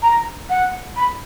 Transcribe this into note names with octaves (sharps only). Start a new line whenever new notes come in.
A#5
F#5
B5